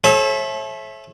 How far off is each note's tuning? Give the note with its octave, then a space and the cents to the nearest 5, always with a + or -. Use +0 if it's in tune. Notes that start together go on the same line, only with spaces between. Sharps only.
A4 -35 C#5 -40 E5 +0